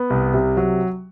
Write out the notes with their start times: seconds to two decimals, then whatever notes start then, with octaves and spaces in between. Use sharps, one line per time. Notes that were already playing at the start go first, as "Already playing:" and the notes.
Already playing: B3
0.10 C2
0.34 C3
0.57 F#3